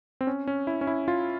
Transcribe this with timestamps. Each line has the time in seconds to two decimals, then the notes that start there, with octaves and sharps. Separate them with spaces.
0.21 C4
0.27 C#4
0.47 C#4
0.67 E4
0.81 C#4
0.87 E4
1.08 F4